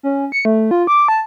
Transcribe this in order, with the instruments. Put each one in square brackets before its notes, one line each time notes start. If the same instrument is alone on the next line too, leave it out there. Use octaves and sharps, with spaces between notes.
[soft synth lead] C#4
C#7
A3
F4
D6
A5